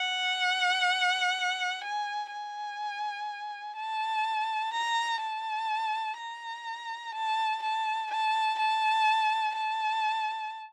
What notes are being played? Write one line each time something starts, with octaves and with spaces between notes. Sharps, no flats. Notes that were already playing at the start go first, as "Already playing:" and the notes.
Already playing: F#5
G#5
G#5
A5
A#5
A5
A#5
A5
A5
A5
A5
A5